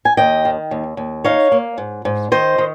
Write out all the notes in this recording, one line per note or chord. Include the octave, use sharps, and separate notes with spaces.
G#5
D#2 D#5 G5
D#3
D#2
D#2
D#4 C#5 F5
A#3
G#2
G#2
D#3 C5 D#5
D#3